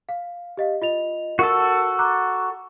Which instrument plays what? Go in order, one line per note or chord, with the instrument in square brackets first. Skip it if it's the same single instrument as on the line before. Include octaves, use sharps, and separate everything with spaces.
[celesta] F5
G4 D#5 F5
F4 D#5 F7
[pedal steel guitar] F#4 A4 [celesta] A#4 E6
[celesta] A#5 D6 F#6